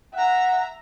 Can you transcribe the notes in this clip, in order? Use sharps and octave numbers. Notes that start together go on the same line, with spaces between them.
E5 F#5 A#5